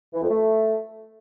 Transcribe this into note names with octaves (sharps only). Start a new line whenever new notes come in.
E3
F2
A3